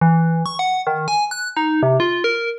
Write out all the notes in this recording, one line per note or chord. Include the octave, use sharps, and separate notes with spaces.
E3
C#6
F#5
D#3
G#5
F#6
D#4
C3
F4
A#4